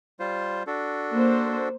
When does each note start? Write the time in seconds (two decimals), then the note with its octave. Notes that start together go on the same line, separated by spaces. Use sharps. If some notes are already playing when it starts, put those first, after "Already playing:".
0.20 G3 F4 C5
0.67 D4 F#4 A4
1.12 A#3 C5